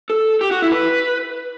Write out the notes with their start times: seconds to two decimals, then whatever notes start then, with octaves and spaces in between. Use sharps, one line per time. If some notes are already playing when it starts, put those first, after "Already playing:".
0.10 A4
0.41 G4
0.51 F#4
0.62 E4
0.72 B4